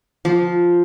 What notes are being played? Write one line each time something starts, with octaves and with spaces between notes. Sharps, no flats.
F3